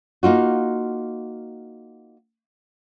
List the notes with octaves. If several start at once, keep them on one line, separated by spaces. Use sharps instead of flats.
A#3 D#4 F4 F#4